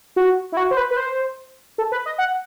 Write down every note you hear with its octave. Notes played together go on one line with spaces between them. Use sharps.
F#4
E4
F#4
C5
B4
B4
C5
A4
B4
D#5
F#5